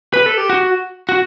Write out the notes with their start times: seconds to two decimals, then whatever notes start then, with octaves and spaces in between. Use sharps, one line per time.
0.14 B4
0.26 A4
0.37 G4
0.50 F#4
1.09 F#4